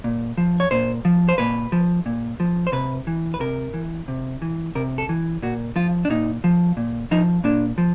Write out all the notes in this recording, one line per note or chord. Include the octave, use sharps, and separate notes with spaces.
A#2
F3
C#5
A#2 C5
F3
C5
A#2 B4
F3
A#2
F3
C5
C3 B4
E3
B4
C3 A#4
E3
C3
E3
C3 A#4
A4
E3
A#2 F#4
F3 F4
D4
A#2 D#4
F3
A#2
F3 D#4
A#2 D4
F3